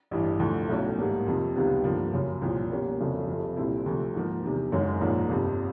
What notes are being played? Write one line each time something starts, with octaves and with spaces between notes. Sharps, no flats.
A1 G2 E3
D2 D3 F3
B1 A2 F#3 A3 C#4
G#2 D#3 G3 A#3
F2 C3 F3
C#2 C3 D#3 G3 B3
G2 D3 F3 A#3
F#2 C#3 F#3
C2 A#2 F3
B2 G3 A#3 C#4
F1 F2 C#3 F#3
F1 F2 C3
C2 A#2 G3 C4 E4
D2 C3 F3
G#2 F3 A#3
E2 C3 D#3
F#1 F#2 D#3 G#3 C#4
A#1 G#2 F3 A#3
G1 F2 C3